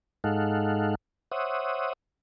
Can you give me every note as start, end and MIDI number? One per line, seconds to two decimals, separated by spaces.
0.24 0.95 44
0.24 0.95 56
0.24 0.95 63
0.24 0.95 69
0.24 0.95 77
0.24 0.95 78
1.32 1.93 72
1.32 1.93 73
1.32 1.93 76
1.32 1.93 78
1.32 1.93 87